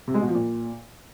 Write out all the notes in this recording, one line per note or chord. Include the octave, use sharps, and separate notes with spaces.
C3
G#3
B2
F3
A#2